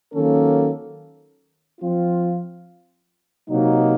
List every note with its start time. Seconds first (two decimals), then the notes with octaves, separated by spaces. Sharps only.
0.12 D#3 F#3 A#3 C#4 A4
1.81 F3 C4 F4
3.48 C3 F#3 A#3 D#4